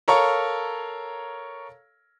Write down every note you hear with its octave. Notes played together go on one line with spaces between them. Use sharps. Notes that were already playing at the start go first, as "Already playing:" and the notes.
A4 A#4 C#5 F5 A#5 C#6